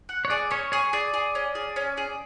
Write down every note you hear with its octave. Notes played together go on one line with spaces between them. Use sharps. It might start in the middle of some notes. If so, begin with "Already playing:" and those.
F#5
C#5
G#4 D5
C#4 C#5
G#4 C#5
G#4 D5
G#4
C#4
G#4
C#4
G#4